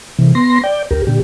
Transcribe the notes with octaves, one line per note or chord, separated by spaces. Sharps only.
C3 E3
B3 C6 A#6
D5 G5
D2 G4 A#4
A#2 D3 G4